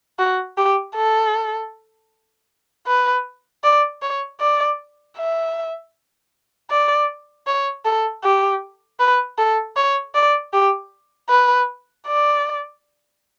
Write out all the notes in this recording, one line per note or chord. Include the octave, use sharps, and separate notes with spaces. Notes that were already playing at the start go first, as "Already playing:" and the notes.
F#4
G4
A4
B4
D5
C#5
D5
E5
D5
C#5
A4
G4
B4
A4
C#5
D5
G4
B4
D5